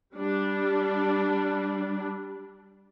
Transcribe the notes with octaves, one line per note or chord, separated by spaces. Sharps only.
G3 D4